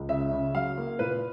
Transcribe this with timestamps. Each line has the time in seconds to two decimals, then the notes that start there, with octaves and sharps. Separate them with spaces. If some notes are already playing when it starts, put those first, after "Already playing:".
Already playing: C#2
0.09 C#3 E5
0.31 C#3
0.54 F#3 F5
0.78 A#3
0.99 A#2 B4